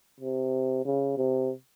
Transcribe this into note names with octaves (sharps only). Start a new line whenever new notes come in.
C3
C#3
C3